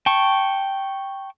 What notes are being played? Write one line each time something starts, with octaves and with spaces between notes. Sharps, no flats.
G5 A5 C#6